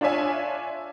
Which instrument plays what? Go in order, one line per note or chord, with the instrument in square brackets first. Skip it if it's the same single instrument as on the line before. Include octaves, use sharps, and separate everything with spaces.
[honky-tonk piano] D4 F4 C#5 E5 G#5